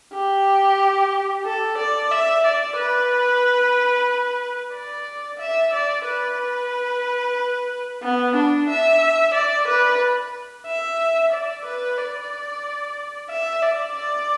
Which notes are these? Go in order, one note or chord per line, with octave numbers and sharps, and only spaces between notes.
G4
A4
D5
E5
D5
B4
D5
E5
D5
B4
B3
D4
E5
D5
B4
E5
D5
B4
D5
E5
D5
D5